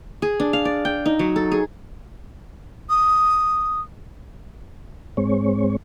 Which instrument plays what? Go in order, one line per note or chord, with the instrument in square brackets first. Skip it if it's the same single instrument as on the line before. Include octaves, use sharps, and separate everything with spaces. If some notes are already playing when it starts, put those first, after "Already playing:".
[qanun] G#4
D4
F5
D5
G5
D#4
F#3
A4
G#4
[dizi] D#6
[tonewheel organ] G#2 G#3 C4 C#5